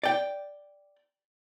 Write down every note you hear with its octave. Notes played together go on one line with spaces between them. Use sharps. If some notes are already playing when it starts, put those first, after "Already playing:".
D5 G5